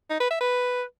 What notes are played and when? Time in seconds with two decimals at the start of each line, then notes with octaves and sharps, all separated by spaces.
0.10 D#4
0.20 B4
0.30 E5
0.41 B4